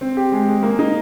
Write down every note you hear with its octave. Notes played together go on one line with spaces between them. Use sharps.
C4
G4
G#3
G#3
A#3
D#4